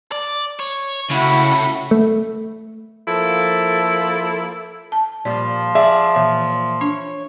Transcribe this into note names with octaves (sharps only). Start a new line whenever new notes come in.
D5
C#5
A2 C#3 E4 F#4
A3
F3 A#3 E4 A4
A5
A#2 F3 G3 F4 D5
G#4 D5 E5 F5
A#2 E3
D4 C#5